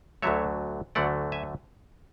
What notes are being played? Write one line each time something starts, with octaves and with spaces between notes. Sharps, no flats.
D2 D3 F#3 A3 C#5 E5
D2 D3 F#3 A3 D5 F#5
E5 G#5